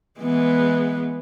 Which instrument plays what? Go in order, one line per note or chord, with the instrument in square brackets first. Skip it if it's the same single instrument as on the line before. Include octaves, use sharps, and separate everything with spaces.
[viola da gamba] E3 G#3 B3